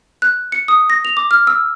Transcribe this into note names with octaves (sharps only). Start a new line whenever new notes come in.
F#6
C#7
D#6
A#6
F7
D6
F6
E6